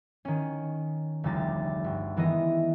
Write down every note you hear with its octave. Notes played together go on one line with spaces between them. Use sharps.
D#3 C#4
F1 D2 C#3 G3 D#4 A6
G1
D#3 E3 G#3 B3 D#5